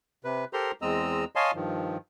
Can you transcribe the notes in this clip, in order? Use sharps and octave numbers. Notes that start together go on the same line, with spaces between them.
C3 B4
G4 A4 A#4 C5 A#5 C6
E2 G#3 C4 D#5 A#5 E6
C#5 D#5 F5 G#5 A5 C6
G2 D#3 F3